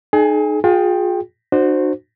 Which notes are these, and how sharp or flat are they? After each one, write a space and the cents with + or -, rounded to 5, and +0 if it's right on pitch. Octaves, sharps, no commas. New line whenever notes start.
D#4 -30 G#4 +40 G#5 -30
F4 +35 G#4 +0 G5 +10
D4 +35 F#4 -15 C5 +0